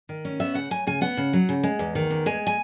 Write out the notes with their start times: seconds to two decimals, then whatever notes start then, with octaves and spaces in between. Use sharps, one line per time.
0.09 D#3
0.25 C#4
0.40 B3 E5
0.54 C#3 F#5
0.71 F#3 G#5
0.87 C#3 G#5
1.01 B3 F#5
1.17 C#3
1.33 F#3
1.49 C#3
1.63 G#3
1.79 E2
1.95 D#3
2.10 E2
2.26 G#3 G#5
2.47 G#5